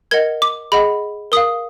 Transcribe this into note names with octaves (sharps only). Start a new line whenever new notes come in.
A#4 D#5 F#5 G#6
D6
G#4 D#5 F#5 B5
A#4 F5 D#6